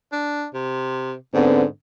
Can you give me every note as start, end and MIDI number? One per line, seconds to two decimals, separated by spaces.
0.12 0.46 62
0.54 1.14 48
1.34 1.67 44
1.34 1.64 50
1.34 1.63 59
1.34 1.63 60